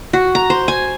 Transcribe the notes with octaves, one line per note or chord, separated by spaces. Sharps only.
F#4
A#5
C5
G#5